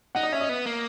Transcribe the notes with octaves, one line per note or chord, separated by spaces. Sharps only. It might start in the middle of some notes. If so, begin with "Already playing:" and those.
D#4 F#5
D#5
C#4 E5
D#5
B3
A#3